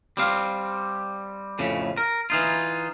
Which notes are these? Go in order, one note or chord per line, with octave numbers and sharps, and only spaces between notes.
G3 C4 F5
F2 A2 C#3
A#4
E3 D#4 F4